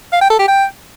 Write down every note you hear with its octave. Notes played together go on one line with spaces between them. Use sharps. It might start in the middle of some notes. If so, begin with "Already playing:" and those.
F5
G5
A4
G4
G5